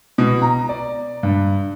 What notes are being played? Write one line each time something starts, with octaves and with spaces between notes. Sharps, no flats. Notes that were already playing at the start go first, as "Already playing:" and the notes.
B2
A#5
D5
G2